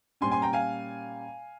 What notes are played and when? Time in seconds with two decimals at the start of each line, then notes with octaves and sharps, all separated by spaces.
0.21 A#2 G3 C#4 G#5 C6
0.31 G#5 C6
0.42 G5 A#5
0.53 F5 G#5